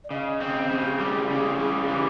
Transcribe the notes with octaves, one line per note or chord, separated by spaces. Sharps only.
D5
C#3 D#5
C4
C#3 G#4
G4
G#4
G3
C#3
G3
E3 G4